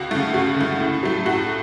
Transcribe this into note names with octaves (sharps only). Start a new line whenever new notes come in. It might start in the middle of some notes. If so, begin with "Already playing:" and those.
Already playing: C#2 F#4
C#3 A3
C#2 F#4
C#3 A3
A2
F#3 A3
A2 F#4